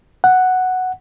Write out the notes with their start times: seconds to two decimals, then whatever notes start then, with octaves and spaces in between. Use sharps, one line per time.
0.24 F#5